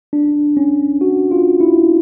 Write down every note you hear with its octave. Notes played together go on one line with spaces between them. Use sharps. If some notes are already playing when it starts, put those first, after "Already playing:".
D4
C#4
F#4
F4
E4